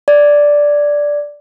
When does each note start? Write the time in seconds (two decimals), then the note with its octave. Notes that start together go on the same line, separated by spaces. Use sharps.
0.08 D5